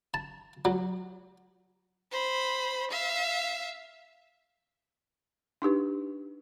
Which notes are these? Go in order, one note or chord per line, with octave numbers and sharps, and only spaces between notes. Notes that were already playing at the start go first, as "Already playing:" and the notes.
A5
F#3
C5 B5
E5 F5
D4 D#4 G4 B4